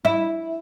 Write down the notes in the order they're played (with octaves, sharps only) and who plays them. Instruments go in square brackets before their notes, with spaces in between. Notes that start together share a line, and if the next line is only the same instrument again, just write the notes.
[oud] E4